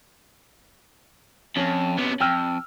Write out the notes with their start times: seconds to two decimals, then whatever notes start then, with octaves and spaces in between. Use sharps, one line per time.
1.57 F2 C#4
1.98 C3 B3
2.21 F2 G5 E6 F6